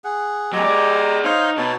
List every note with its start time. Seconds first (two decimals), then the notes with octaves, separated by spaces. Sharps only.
0.04 G#4 F#5
0.53 F#3 G#3 A3 G4 A#5
0.64 G#4 D5
1.24 D#4 C5 C#5 F5
1.57 B2 D#4 C#5 A5